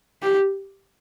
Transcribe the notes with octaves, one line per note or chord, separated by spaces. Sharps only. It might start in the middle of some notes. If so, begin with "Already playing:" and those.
G4